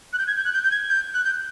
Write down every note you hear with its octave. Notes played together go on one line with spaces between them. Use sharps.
F#6
G6
G#6
G6
F#6
G6
G6
G#6
G6
F#6
G6